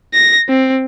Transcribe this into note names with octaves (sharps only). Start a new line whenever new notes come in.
A#6
C4